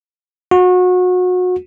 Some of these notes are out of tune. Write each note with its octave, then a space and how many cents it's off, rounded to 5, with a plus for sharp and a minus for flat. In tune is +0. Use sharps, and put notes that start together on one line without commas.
F#4 -30